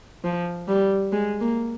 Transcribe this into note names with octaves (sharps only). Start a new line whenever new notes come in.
F3
G3
G#3
A#3